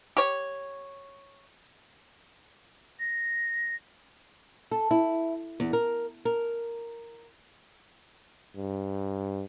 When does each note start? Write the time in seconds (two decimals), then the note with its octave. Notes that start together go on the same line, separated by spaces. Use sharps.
0.17 G4 C#5
3.00 A#6
4.71 A4
4.91 E4
5.60 E2
5.73 A#4
6.25 A#4
8.57 G2